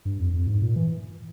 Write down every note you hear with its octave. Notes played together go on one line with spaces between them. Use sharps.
G2
F2
F2
G#2
A#2
E3